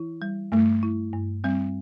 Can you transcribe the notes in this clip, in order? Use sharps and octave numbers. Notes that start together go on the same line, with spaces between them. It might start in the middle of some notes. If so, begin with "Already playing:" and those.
Already playing: E3 E4
G3
G2 A3
E4
G2
G3 C4